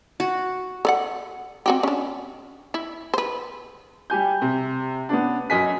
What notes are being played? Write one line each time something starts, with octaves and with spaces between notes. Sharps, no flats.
F#4
A4 D5 F#5
C4 F#4 G4
C#4 D4
E4
B4 C5
G3 G4 G#5 G6
C3
B3 C#4 D4
F#2 D#5 G#5 B6